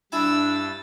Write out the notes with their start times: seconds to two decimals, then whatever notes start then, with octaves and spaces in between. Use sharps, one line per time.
0.12 G2 D4 E4 G#5 E6 A6